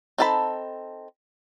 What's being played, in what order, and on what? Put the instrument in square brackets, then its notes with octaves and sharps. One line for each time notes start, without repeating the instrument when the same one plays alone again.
[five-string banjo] C4 D#4 A4 A5 B5